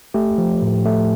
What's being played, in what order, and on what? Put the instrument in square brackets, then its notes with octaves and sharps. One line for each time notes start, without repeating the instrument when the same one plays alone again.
[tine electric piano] A3 G4
F3
A2
A3